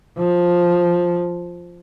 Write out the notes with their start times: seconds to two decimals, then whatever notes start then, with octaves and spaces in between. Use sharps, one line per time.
0.18 F3